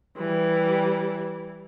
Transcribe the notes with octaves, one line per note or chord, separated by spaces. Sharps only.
E3 G3